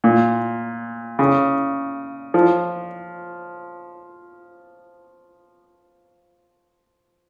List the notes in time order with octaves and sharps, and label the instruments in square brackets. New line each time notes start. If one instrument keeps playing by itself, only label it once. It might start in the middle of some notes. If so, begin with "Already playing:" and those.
[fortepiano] A#2
C#3
F3